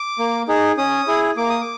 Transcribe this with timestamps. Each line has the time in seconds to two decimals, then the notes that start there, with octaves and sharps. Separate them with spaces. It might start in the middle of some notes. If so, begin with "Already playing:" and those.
Already playing: D6
0.19 A#3
0.48 D#4 G#4
0.77 C#4 D#6
1.07 E4 G#4
1.37 A#3 D6
1.50 D#6
1.61 D6